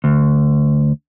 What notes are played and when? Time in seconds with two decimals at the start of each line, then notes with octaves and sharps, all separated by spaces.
0.04 D2